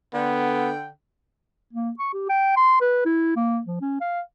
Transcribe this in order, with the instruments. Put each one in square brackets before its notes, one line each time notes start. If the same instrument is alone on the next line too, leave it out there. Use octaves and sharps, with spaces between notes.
[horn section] D3 G5 [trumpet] B3
[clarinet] A#3
C#6
G4
G5
C6
B4
E4
A#3
F3
C#4
F5